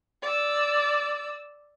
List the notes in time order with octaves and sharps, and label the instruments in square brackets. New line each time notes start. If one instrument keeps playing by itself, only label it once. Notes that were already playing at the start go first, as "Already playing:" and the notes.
[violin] D5 E6